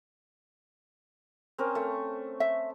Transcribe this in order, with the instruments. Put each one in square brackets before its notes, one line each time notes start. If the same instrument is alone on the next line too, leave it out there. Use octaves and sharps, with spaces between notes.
[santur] C4 C#4 A#4
A3
[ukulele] E5